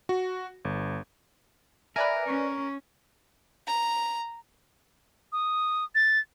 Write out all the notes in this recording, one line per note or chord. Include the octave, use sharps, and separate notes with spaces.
F#4
G1
A#4 B4 D5 E5 G#5
C#4 C#6
A#5
D#6
A6